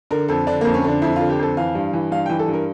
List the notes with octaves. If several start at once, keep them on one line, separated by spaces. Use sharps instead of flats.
D3 A#4
F2 A4
D3 D4
F2 A#3
C#4
D3 D4
F2 E4
D3 F4
G4
F2 A4
E3 F5
G2
E3
G2 F5
E3 G5
A4
G2
A#4